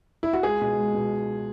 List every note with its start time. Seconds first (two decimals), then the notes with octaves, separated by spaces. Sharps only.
0.23 E4
0.33 F#4
0.43 C#2 G#4
0.61 B2 G#3
0.77 C#2
0.94 B2